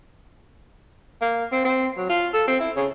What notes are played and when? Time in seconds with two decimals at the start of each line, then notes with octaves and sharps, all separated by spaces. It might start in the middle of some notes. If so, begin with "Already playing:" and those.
1.22 A#3
1.52 C4
1.65 C4
1.97 F#3
2.09 F4
2.34 A4
2.48 C4
2.60 E4
2.76 C#3